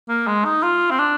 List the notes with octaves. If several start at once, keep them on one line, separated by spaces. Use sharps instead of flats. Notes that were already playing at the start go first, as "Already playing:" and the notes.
A#3
G#3
D#4
F4
C4
D4